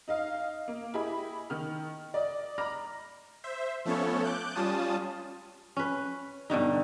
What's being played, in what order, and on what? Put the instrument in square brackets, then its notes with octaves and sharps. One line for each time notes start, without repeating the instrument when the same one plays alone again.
[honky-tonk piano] D#4 D#5 F5
A#3
E4 G4 G#4 D#5 B5
D#3 F6
D5 D#5
A#5 B5 D6 F6 A#6
[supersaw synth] C5 E5
F3 A3 B3 C#4 A4 C#5
D6 F#6 G6
G3 C#4 F4 A5 D#6
[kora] C#4 B4
G2 B2 D3 D#4